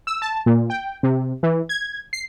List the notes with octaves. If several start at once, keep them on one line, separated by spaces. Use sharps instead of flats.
E6
A5
A#2
G5
C3
E3
G#6
C7